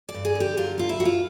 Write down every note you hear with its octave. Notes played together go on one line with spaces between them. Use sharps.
D5
G2
G#4
D3
G4
F#3 F4
G2 F4
E4
G2 F#4
F4